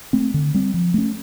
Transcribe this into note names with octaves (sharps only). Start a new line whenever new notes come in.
A3 C4
D3
G3 C4
F3
A3 C#4